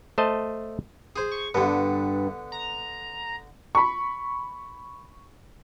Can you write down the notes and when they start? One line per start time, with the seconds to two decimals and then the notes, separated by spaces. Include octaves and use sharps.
0.18 A3 C5 D#5 A5
1.16 G#4 C5
1.31 C#6
1.54 G2 D3 B3
2.52 A#5
3.75 B5 C#6